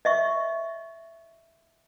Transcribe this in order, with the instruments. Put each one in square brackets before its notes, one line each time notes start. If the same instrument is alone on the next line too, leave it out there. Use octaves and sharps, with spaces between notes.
[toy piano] D#5 E5 C#6